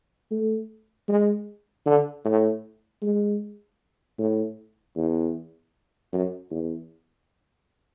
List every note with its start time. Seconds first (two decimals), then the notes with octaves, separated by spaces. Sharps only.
0.31 A3
1.09 G#3
1.86 D3
2.25 A2
3.02 G#3
4.19 A2
4.96 E2
6.13 F#2
6.51 E2